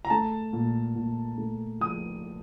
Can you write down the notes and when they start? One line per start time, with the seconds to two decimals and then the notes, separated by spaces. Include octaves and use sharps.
0.05 A#5
0.10 A3 A5
0.53 A#2
0.95 A#2
1.38 A3
1.80 F3 D#6